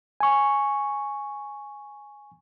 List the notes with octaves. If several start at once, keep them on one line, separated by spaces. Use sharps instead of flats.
G#5 C#6